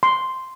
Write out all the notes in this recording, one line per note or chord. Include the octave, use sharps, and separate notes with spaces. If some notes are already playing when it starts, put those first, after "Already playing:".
C6